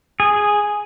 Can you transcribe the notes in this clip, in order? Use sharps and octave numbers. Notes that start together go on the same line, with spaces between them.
G#4